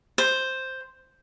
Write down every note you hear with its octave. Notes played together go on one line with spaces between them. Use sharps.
C5